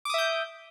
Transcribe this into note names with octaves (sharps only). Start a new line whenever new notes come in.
E5 D6 D#6 G6